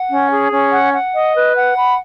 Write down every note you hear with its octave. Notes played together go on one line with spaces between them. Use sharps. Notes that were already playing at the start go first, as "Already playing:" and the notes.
Already playing: F#5
C#4
G#4
C#4
F#5
F#5
D#5
B4
F#5
B5